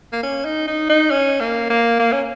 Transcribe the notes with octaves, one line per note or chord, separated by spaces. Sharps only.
A#3
C#4
D#4
D#4
D#4
C#4
A#3
A#3
A#3
C#4